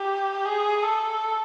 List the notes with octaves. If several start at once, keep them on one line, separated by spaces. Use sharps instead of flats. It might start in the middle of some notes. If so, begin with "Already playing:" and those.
Already playing: G4
G#4
A4